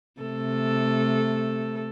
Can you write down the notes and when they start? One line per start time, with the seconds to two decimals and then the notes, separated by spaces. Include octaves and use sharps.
0.21 C3 A3 A4